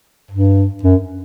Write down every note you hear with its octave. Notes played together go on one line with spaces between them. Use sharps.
G2
F#2